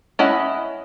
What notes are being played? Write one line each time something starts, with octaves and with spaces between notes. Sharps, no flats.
C#4 E4 D#5 F#5